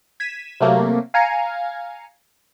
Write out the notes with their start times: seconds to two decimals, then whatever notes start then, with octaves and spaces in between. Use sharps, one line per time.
0.20 G#6 B6 D#7 E7
0.61 C3 F#3 A3 A#3
1.14 F5 G#5 A#5 F6 G#6 C#7